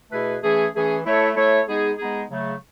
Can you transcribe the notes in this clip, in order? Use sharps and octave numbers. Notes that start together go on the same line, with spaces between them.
B2 A3 E4 G#4 B4
E3 A3 C#4 G#4
E3 A3 C#4 G#4
A3 E4 A4 C#5
A3 E4 A4 C#5
G#3 B3 D#4 G#4
G#3 B3 D#4 G#4
C#3 F#3 A3